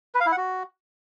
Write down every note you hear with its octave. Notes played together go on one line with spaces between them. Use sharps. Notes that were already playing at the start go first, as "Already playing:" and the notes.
B4
F5
E4
F#5
F#4